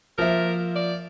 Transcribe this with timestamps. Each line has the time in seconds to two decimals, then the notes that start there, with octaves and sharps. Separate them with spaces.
0.18 F3 A#3 A#4 E5
0.76 D5